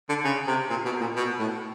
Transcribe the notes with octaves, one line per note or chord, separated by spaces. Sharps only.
D3
C#3
C3
A#2
B2
A#2
B2
A2